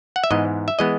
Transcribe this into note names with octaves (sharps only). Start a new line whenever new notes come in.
F#5
E5
G#2 E3 G#3 B3 D#5
E5
E3 G#3 B3 D#5